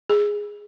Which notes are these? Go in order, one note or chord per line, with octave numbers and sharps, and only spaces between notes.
G#4